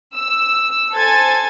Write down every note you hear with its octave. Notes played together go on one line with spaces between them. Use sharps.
E6
A4 C5 G#5 G#6 A6